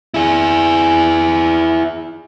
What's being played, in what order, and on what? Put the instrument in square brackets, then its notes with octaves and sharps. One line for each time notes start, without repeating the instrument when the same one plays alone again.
[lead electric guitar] E4 G#4